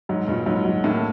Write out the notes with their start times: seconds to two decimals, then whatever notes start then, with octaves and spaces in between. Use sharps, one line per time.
0.09 G#2 F#3
0.28 G2 A#2
0.46 G#2 F#3
0.65 F#3
0.84 A2 A#3